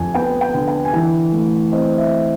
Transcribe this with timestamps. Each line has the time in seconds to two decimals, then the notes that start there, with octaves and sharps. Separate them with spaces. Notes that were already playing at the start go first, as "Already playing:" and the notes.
Already playing: F2 D3 G#5
0.14 B3 G5
0.41 G5
0.54 D3
0.68 G5
0.85 G#5
0.93 E3 G5
1.33 A3
1.72 C4 D#5
1.98 E5